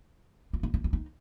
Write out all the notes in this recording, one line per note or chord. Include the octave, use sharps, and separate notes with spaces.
E4
D#4
D#4
E4
D#4